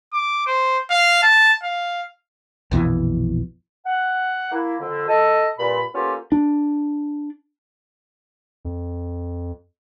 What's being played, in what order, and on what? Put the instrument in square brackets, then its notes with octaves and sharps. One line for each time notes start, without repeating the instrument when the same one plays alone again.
[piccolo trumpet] D6
C5
F5
A5
F5
[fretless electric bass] A#1 F2 B2 E3
[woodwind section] F#5
A#3 E4
F2 D3
A4 D#5
G2 A#2 B5
A#3 B3 C#4 F4 G4 A4
[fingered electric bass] D4
[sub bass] F2